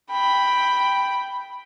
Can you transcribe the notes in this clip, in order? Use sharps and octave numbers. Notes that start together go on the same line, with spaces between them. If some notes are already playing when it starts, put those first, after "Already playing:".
G5 B5